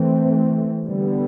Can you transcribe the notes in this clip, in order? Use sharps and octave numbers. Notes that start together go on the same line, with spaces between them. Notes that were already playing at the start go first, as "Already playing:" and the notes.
Already playing: E3 A3 C4
D3 G3 B3